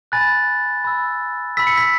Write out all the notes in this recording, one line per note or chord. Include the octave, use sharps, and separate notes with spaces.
G#5 B5 F#6 A6
B5 E6
B5 E6 B6
C#7
B6